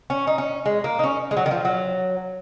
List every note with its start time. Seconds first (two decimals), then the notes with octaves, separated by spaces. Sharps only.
0.10 C#4
0.27 D#4
0.38 C#4
0.66 G#3
0.84 A#3
0.99 D#4
1.04 C#4
1.31 G#3
1.37 F#3
1.46 D#3
1.51 F3
1.65 F#3